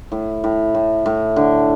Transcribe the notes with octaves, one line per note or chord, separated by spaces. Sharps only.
A2
A2
A2
A2
D3